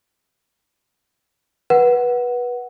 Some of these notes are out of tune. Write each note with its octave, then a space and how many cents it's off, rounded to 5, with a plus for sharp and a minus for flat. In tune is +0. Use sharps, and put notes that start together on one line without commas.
B4 -20 F#5 +0